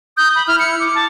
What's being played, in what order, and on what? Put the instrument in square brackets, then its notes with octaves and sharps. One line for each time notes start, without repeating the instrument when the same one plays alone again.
[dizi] D#6 [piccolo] G6
[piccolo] B5
[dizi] E4 [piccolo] F6
[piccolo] C#7
[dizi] D6
[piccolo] A5